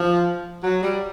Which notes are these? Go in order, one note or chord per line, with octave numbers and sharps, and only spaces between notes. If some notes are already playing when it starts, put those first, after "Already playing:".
Already playing: F3
F#3
G3